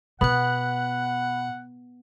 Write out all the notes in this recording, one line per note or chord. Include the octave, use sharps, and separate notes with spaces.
B2 B3 F#5 B5 F#6